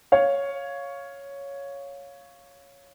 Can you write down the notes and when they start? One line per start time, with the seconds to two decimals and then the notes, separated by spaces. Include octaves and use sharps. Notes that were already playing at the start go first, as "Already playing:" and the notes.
0.12 C#5 F5